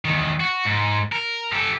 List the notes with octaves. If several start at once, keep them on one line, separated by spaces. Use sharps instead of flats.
E2 D#3
F#4
G#2
A#4
G4 A4